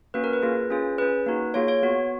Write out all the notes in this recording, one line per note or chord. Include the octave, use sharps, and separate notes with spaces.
A#3 C#4 F#4 B4
A#4
B4
A#3 F4 G#4
C#4 F4 G#4
C#4 G#4 B4
A#3 D#4 F#4
A#3 F4 G#4 C#5
C#5
B3 F#4